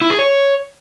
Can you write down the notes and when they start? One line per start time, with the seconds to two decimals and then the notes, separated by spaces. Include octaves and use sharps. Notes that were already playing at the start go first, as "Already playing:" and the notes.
0.02 E4
0.10 G#4
0.19 C#5